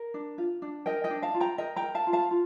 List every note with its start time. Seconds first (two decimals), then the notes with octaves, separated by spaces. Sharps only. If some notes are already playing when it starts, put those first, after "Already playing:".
Already playing: A#4
0.14 D4
0.38 F4
0.62 D4
0.86 A#4 D#5 G5
1.04 D#5 G5
1.10 D4
1.23 F5 A5
1.34 F4
1.40 G5 A#5
1.58 A#4 D#5 G5
1.76 G5 A#5
1.83 A#4
1.95 F5 A5
2.07 F4
2.13 F5 A5
2.31 F4